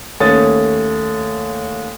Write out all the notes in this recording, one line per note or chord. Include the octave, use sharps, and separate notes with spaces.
D#2 A3 C#4 C#5 D#6 A6